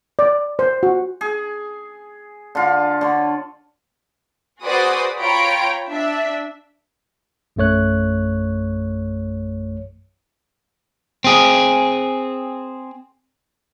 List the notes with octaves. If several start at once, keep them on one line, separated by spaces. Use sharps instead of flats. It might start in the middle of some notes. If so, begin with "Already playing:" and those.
D5
C5
F#4
G#4
D3 F4
D3 C#5
F#4 G#4 B4 C5 D5 D#6
F4 C#5 G5 A#5 B5 D7
D4 E5
A#1 F#2 A3 C#5 F#6
C4 G#4